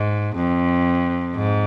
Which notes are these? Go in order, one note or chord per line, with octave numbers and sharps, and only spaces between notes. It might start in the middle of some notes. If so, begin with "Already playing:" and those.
Already playing: G#2
F2
G#2